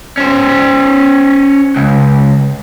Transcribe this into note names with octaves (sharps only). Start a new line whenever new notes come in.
C#4 C5
C#2